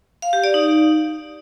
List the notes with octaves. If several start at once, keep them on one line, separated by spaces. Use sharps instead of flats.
F5
G4
D5
D#4